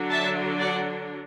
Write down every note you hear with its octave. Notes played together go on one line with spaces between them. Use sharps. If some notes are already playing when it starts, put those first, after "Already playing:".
Already playing: D3 F#3 D4
E5 A5
D5 F#5